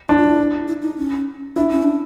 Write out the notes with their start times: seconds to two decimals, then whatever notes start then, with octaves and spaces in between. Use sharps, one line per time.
0.09 D4 E4
0.17 F4
0.24 E4
0.68 E4
0.82 D#4
0.98 C#4
1.56 D4 E4
1.71 C#4
1.83 D4